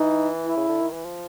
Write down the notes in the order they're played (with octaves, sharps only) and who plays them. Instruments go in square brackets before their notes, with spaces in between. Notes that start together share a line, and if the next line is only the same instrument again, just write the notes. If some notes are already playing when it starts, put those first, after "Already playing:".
Already playing: [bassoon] E3 [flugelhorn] D#4
[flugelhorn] E4
[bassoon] C#3
D3
D#3
E3
F3